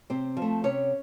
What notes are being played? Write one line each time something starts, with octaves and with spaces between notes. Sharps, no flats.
C3 C4 C5
F3
A3
C3 C#4 C#5